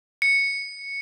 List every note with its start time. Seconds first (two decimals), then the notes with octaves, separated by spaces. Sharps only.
0.22 C#7